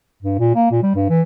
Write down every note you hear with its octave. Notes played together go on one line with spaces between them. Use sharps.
G2
A#2
A#3
A#2
G3
G2
E3